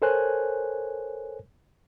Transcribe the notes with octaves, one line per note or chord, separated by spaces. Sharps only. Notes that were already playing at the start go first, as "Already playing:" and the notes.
A4 A#4 C5 C#5 G#5 F#6